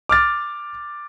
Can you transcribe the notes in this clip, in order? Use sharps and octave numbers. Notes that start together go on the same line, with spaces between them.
D6 F6 A6